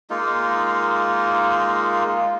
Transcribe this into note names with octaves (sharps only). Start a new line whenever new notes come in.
G#3 A#3 D#4 F4